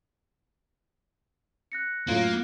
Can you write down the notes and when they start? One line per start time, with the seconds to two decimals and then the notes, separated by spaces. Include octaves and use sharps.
1.72 F#6 A#6 C#7
2.08 F#2 A2 A#3 F4